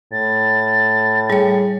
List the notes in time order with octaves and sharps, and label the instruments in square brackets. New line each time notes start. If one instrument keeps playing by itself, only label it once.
[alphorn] A2 [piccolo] A6
[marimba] G3 C#5 [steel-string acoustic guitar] G#4